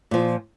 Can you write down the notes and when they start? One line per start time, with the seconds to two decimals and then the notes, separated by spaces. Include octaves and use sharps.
0.11 A#2 F3